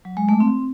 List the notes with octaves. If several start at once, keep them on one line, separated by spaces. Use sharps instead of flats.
F#3
G#3
A3
C4